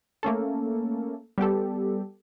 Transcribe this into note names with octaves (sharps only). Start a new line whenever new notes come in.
A3 A#3 C#4 A4
G3 B3 G4 A4